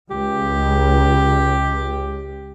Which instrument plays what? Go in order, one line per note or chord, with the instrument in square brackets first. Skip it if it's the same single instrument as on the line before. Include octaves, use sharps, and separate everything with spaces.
[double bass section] C#2 [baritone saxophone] G4